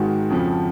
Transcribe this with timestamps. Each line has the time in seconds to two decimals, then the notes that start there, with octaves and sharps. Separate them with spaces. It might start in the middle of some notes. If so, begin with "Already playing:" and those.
Already playing: G#2 D#3 G#3 F#4
0.30 F2 C#3 F3